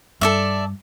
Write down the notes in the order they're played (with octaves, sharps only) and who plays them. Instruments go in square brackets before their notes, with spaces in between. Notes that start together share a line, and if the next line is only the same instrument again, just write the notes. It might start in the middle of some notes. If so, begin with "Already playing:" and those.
[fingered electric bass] G2 [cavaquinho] A4 D5 E5